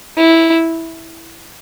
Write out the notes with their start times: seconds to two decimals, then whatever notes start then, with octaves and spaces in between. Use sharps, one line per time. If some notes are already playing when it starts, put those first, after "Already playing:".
0.17 E4